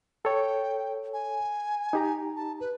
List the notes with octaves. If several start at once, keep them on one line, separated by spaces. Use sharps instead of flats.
A4 C#5 G5
G#5
D#4 G4 A#5
A5
B4